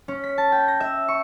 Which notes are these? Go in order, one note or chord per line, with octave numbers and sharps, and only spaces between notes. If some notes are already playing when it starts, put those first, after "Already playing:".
C#4
B6
A5
G5
A#6
E5
C#6